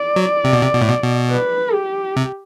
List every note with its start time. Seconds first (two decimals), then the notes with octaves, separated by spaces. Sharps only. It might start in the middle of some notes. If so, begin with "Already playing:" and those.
Already playing: D5
0.16 F#3
0.44 C3
0.53 B2
0.62 C3
0.74 B2
0.81 A2
0.89 B2
1.03 B2
1.31 B4
1.73 G4
2.16 C3